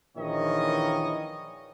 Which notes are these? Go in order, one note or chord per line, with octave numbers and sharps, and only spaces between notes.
A#1 A#2 D#3 E3 C#5 D#5